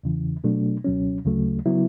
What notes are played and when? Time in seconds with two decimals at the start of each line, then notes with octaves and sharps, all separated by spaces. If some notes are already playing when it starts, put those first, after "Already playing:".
0.03 E2 C#3 E3
0.44 B2 F#3 A3 D4
0.84 C#2 B2 F#3 C#4
1.25 D2 C#3 F#3 A3
1.66 C#3 F#3 B3 E4